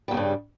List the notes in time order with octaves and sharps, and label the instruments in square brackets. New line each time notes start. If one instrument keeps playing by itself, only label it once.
[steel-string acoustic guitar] G3
E2
C#3
G2